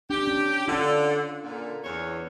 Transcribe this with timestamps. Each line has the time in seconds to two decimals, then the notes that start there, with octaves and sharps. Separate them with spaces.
0.10 D4 G4
0.27 C#4
0.68 D3 C#4 F4
1.43 A#2 D3
1.84 E2 C#5